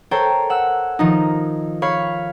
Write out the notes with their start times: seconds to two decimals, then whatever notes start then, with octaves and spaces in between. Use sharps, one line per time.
0.11 A4 A#4 C5 C#5 G5 A#5
0.50 F#5 E6
0.99 D#3 F3 D#4
1.82 C#5 F5 B5 C#6